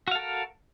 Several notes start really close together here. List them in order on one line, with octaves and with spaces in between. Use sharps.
F#4 F5 A4 A#4